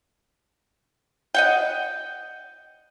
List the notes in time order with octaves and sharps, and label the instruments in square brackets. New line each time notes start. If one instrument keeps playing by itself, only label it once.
[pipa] D#5 F#5 G5